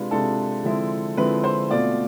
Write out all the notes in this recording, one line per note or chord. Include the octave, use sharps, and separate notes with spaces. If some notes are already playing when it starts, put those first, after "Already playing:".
Already playing: C3 G#3 D4 F4 B4
C3 G#3 D4 F4 A4
D3 F3 G#3 C4 E4
D3 F3 G#3 C4 E4 B4
C5
B2 A3 C4 F4 D5